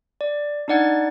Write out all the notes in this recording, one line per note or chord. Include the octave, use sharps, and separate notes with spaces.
D5
D4 D#4 D5 F#5 G#6 A6